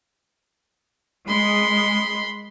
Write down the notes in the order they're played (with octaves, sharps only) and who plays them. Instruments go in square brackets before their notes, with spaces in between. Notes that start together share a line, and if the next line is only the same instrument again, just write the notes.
[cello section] G#3 [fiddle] B5 C6